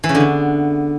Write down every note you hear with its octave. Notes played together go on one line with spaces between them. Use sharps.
E3
C#3
D3
B3